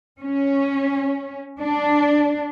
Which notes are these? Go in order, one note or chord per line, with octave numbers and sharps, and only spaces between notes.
C#4
D4